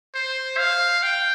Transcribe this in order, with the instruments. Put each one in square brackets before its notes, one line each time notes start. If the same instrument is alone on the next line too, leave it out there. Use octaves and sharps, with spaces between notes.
[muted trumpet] C5
F5
G5